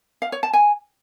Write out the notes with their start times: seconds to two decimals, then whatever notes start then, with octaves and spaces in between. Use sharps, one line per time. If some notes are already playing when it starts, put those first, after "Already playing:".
0.22 F5
0.32 C#5
0.43 A5
0.53 G#5